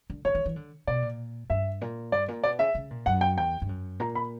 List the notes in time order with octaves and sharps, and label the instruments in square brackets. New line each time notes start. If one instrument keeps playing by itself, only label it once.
[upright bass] D3
[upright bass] D3 [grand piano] C#5
[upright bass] E3
E3
D3
[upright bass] B2 [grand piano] D5
[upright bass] A#2
[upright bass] G2 [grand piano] E5
[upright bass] A#2
[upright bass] G2 [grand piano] D5
[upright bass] A#2
[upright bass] B2 [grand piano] D5
[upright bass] C#3 [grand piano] E5
[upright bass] C#3
A#2
[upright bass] F#2 [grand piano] F#5
[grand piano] G5
[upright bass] E2 [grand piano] G5
[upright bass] G2
F#2
[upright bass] A#2 [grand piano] A#5
[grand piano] B5